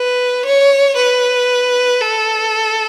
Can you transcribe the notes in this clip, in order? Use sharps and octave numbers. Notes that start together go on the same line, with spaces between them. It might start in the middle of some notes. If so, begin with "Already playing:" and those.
Already playing: B4
C#5
B4
A4